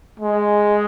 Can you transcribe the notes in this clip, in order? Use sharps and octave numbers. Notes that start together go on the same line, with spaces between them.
G#3